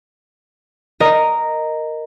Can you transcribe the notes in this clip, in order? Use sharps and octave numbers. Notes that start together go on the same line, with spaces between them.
A#4 D#5